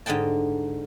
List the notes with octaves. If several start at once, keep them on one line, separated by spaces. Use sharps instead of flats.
G#2 D3 D#5 G5 A5